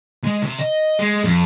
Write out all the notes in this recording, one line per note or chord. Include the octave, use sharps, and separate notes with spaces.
G#3
C3
D#5
G#3
F2